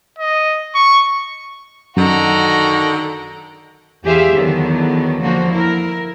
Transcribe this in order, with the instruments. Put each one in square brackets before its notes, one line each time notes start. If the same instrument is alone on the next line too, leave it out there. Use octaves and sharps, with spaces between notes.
[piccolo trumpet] D#5
C#6
[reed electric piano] F#2 [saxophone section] D3 D#3 [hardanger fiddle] F#4 A#5
[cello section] E2 G4 G#4 C5 E5 F5
E2 D3 D#3 F#3 B3
D3 F3 A#3 F#4 C5
E4 A#4